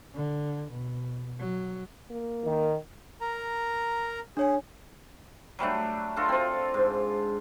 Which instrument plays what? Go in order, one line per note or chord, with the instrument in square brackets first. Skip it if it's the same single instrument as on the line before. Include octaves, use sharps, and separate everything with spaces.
[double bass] D3
B2
F#3
[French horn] A#3
[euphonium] D#3
[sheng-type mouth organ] A#4 A#5
[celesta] D4 C#5 G#5 [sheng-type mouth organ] G#4
[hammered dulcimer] F#3 G3 A3 D4
D4 F4 F#4 A4
C4 F4
G#2